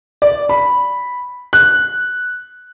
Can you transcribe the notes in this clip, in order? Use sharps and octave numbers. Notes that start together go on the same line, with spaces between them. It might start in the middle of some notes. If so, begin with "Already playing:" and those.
D5
B5
F#6